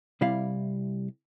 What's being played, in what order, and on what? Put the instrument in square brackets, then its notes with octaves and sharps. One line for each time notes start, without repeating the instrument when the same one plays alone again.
[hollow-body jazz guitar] C3 G3 E4 F5